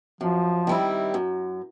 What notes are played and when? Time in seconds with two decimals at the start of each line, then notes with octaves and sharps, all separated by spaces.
0.21 F#2 F3
0.67 D#3 G3 C4 E4
1.14 F#2